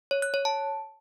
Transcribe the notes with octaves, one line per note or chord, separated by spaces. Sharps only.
C#5
F#6
C#5
A5